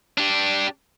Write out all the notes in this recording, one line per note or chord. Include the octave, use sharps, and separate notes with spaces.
D4 G4